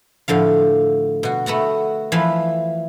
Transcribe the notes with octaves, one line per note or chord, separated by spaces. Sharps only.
A2 D3 F3 F5
B2 F#4
A3 B3 F#4 F#5
E3 F3 F5 B5